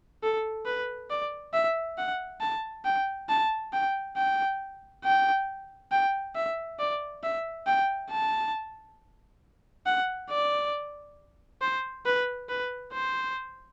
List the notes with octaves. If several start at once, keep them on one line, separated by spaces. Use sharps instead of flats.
A4
B4
D5
E5
F#5
A5
G5
A5
G5
G5
G5
G5
E5
D5
E5
G5
A5
F#5
D5
C5
B4
B4
C5